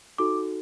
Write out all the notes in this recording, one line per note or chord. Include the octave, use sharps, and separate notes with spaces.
D#4 F#4 A4 D6